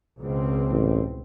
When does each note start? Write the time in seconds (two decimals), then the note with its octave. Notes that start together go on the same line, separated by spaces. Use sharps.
0.20 C#2 B2 C4
0.71 A1